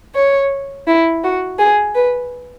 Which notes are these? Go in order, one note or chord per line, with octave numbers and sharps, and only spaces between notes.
C#5
E4
F#4
G#4
B4